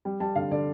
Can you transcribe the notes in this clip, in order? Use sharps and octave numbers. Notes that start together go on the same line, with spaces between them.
G3
G3 A5
D3 F5
D3 D5